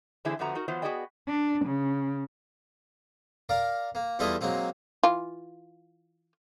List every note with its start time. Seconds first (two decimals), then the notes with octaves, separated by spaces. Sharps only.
0.25 D3 E3 G#3 C4 E4 G#4
0.39 F2 D3 A3 B3 F#4 A#5
0.55 D#4 F#4 A#4
0.68 E3 F#3 B3 F4 C5
0.82 B3 F#4 G#4 D5 D#5 G5
1.28 D4
1.65 C#3
3.49 A#4 D5 F5
3.95 A#3
4.19 E2 G3 E4 F4 A4 D#5
4.41 F#3 G#3 A#3 C4
5.03 E3 F4